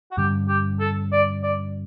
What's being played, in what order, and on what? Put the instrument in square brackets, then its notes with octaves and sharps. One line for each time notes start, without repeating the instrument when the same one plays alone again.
[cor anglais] F#4
[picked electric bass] G2 D3 G3 C#4 [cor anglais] G4
[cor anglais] G4
A4
D5
D5